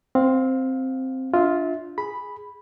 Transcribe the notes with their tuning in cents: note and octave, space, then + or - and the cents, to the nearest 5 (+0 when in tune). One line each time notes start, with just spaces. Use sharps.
C4 +0 F5 +20
D4 +0 F4 +0 E5 -30
G#4 +0 B5 +0